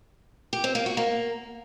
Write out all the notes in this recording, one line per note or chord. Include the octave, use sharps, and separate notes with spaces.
G4
C4
A#3
F#4
A#3